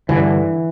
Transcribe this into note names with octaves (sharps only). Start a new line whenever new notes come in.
G2 D3 E3